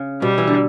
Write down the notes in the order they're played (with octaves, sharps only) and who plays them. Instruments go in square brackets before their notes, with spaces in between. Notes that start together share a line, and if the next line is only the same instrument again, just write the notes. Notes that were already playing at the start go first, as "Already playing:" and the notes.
Already playing: [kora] C#3
[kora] B2 [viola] G3
[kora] E3
D3